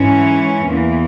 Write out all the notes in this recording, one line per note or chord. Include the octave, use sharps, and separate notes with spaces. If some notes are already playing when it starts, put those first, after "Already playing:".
Already playing: G#2 E3 C#4
E2 E3 A#3